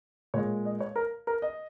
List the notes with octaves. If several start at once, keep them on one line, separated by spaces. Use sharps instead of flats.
A#2 G#3 C#5
D#5
C#5
A#4
A#4
D#5